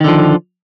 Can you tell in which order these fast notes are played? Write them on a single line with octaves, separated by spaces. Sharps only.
D#3 D3 F3